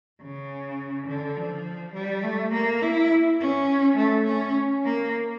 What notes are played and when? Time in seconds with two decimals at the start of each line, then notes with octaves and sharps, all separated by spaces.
0.21 C#3
1.07 D3
1.36 F3
1.94 G3
2.23 A3
2.52 A#3
2.82 E4
3.40 C#4
3.97 A3
4.26 C#4
4.84 A#3